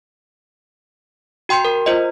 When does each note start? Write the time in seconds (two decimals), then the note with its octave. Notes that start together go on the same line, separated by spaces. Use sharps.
1.49 F#4 G5 C6 G6 C#7
1.65 A#4
1.86 F4 C5 D#5